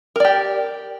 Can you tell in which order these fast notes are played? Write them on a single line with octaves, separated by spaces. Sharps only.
A#4 D5 G4